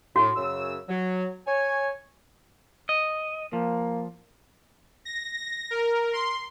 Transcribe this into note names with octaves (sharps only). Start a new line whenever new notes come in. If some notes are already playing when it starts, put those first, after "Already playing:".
A2 F#4
F#2 C#3 E6
F#3
C#5 G#5
D#5
F3 A#3
A#6
A#6
A#4
C6